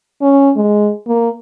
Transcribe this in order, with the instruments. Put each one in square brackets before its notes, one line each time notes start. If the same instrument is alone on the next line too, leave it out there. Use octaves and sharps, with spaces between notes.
[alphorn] C#4
G#3
A#3